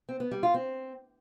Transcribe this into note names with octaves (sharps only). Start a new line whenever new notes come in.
C4
B3
G3
F4
C4